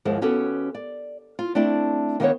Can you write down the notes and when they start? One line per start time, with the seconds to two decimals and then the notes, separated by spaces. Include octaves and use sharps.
0.05 D#2 G#2 F3 G#3 E4 C5
0.21 D#2 B3 C#4 F#4 G4 A4
0.75 D5
1.39 F4
1.55 A3 C4 D4 E4 D5
2.20 D#3 A#3 B3 A#4 C5 C#5